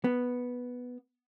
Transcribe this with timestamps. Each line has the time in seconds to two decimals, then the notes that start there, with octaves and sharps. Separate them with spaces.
0.04 B3